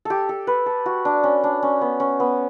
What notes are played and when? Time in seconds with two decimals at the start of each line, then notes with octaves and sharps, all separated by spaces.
0.05 G4 A4
0.29 A4
0.47 B4
0.66 A4
0.86 F#4
1.05 D4
1.24 C#4
1.44 D4
1.63 C#4
1.81 B3
2.00 C#4
2.20 B3